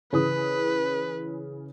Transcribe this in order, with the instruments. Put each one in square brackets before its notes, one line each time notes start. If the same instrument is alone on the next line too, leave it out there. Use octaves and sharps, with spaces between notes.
[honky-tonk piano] C#3 E3 D#6 [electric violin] B4